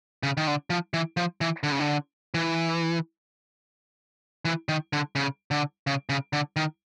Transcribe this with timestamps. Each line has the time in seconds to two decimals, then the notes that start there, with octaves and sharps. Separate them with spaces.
0.23 C#3
0.37 D#3
0.47 D3
0.70 F3
0.94 E3
1.17 F3
1.41 E3
1.63 D3
1.72 C#3
1.80 D3
2.34 E3
4.45 E3
4.69 D#3
4.93 D3
5.15 C#3
5.51 D3
5.87 C#3
6.09 C#3
6.33 D3
6.56 D#3